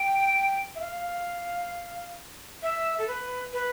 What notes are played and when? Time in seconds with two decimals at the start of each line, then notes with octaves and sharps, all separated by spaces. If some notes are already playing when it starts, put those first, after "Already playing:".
Already playing: G5
0.75 E5
0.81 F5
2.63 E5
2.98 A4
3.08 B4
3.53 B4